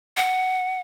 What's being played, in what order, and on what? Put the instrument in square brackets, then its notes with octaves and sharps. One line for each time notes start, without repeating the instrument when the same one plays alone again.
[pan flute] F#5